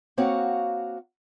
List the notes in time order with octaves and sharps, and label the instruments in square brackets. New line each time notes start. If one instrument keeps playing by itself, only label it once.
[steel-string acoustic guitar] A#3 C4 F#4 C#5 F5 F#5